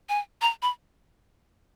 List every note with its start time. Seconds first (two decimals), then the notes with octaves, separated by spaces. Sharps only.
0.09 G#5
0.42 A#5
0.63 B5